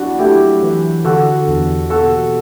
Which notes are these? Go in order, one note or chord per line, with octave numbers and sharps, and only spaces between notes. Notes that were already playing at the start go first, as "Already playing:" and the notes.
Already playing: F#3 D4 E4 F#4
A3 E4 G4
E3
D3 F#4 A4
E2
B2 F#4 A4